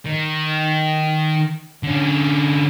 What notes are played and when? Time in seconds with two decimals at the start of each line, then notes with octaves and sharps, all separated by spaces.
0.06 D#3
1.83 D3 C#4